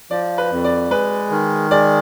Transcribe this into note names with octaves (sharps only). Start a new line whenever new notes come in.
F3 D5
B4
F2
D5
G#3 B4
D#3
G#3 D5